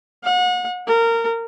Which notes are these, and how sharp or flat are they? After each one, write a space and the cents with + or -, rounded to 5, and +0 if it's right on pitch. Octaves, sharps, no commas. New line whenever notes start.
F#5 -35
A#4 -20